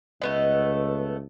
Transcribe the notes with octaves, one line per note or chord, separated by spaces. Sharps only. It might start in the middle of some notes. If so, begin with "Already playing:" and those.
C#2 A3 B3 D#5